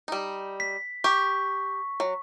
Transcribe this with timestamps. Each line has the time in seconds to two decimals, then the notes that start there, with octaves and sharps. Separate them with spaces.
0.08 G3 D#4
0.60 B6
1.04 G4 C#6
2.00 F#3